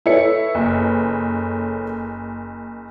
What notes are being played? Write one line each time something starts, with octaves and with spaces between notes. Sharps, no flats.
E4 A4 B4 C#5 C#7
F#1